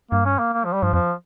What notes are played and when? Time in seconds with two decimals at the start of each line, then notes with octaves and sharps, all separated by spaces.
0.11 G2 A#3
0.25 C#4
0.39 A#3
0.53 A#3
0.65 F3
0.73 G3
0.83 G2 F3
0.93 F2 F3